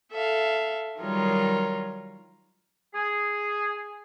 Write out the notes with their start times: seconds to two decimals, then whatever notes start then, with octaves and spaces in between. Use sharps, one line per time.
0.12 A4 E5 F5
1.01 D#3 F#3 G3 F4 A#4 C#5
2.94 G#4